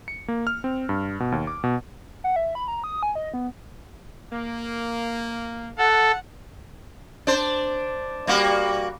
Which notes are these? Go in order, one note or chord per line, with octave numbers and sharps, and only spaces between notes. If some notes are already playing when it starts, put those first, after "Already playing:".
C#7
A#3
F6
C4
G2
B2
D#2
D6
B2
F#5
E5
B5
A#5
D#6
G#5
D#5
B3
A#3
A4 F#5
D4 C5
G3 A#3 F#4